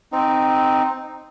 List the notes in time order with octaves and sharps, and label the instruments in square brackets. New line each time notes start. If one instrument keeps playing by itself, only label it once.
[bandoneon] C4 D#4